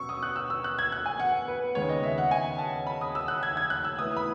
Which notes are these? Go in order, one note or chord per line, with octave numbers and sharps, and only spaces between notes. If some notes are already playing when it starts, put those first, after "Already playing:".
Already playing: B2 F#3 C#4 C#6 E6
D#6
F#6
E6
E6
F#6
G#6
F#6
G#5
F#5
B4
D#2 C#3 G#3 B3 C#5
D#5
E5
F#5
G#5
A5
B5
D#6
E6
F#6
G#6
G#6
F#6
E6
A2 E3 B3 E4 D#6
B5